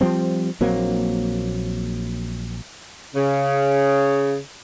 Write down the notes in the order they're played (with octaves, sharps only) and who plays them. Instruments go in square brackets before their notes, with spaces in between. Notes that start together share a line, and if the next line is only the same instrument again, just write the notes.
[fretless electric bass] F3 G3 C4
A#1 F#3 A#3 C4
[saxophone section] C#3